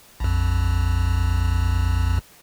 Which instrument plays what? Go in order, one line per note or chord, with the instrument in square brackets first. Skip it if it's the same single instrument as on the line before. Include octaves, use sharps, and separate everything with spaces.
[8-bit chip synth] A#1 F2